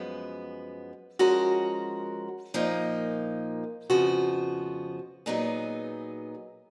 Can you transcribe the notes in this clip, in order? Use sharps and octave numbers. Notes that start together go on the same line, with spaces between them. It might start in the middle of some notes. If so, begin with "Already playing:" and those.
Already playing: F#2 F3 G#3 B3
F3 G#3 C#4 F#4 A#4
A#2 F3 A#3 D#4
F2 C#3 F3 B3 F#4
A#2 F#3 B3 D#4 G#4